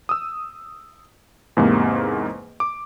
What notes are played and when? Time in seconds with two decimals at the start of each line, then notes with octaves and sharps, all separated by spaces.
0.09 D#6 E6
1.57 E2 G#2 C3 A#3
2.60 D6